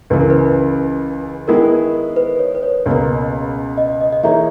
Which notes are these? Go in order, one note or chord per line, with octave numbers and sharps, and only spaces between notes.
C#2 C#3 E3 B4
A#4
B4
D#3 G#3 B3 E4 A#4
B4
C#5
B4
C#5
C#2 B2 A#3
D#5
D#5
D#5
E3 A#3 D#4 G#4 C#5 E5